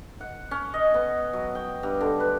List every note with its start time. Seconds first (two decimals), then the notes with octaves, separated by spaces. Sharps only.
0.21 F#5
0.51 C#4
0.74 D#5
0.94 B3
1.33 F#3
1.55 G5
1.83 G2
2.01 D3
2.20 B4